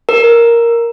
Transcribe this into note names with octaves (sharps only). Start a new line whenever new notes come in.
A#4